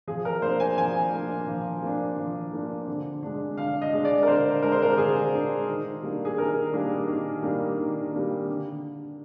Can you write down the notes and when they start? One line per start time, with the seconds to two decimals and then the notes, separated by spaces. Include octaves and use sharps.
0.07 F3 G#4
0.25 A#4
0.42 A#3 D4 C5
0.60 G#5
0.78 F3 G#5
1.12 A#3 D4
1.47 F3
1.82 A#3 D4
2.17 F3
2.53 A#3 D4
2.87 D3
3.23 G#3 D4
3.58 D3 F5
3.82 D#5
3.93 G#3 D4
4.05 D5
4.23 A#4
4.27 D3 C5
4.63 G#3 D4 A#4
4.72 C5
4.82 A#4
4.97 D3 G#4
5.33 G#3 D4
5.67 D#3
6.02 G3 A#3 D4
6.25 G#4
6.38 D#3 A#4
6.73 G3 A#3 D4
7.08 D#3
7.43 G3 A#3 D4
7.77 D#3
8.13 G3 A#3 D4
8.47 D3